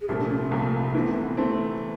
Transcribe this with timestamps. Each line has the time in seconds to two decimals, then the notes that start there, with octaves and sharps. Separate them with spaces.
0.01 G#4
0.08 C2 A#2 F3 A3 G4
0.19 D4
0.30 C#4
0.40 C4
0.51 C2 A#2 F3 A3 A#3
0.94 C3 E3 A3 B3 C4
1.37 C3 E3 A3 C4